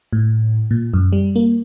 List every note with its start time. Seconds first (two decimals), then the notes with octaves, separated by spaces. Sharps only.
0.13 A2
0.71 A#2
0.94 F#2
1.13 G3
1.36 A#3